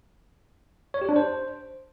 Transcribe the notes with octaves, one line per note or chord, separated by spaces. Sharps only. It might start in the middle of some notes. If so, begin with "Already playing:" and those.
C#5
G4
D4
C5